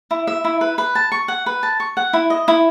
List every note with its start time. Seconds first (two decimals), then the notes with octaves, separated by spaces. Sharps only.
0.11 E4
0.27 E5
0.45 E4
0.61 B4
0.78 B4
0.95 A5
1.12 C#6
1.28 F#5
1.46 B4
1.63 A5
1.80 C#6
1.97 F#5
2.13 E4
2.30 D#5
2.48 E4